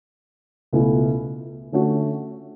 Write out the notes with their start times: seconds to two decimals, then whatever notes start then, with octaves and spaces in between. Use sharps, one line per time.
0.73 C#2 B2 A3 E4 A4
1.72 D3 A3 C#4 F#4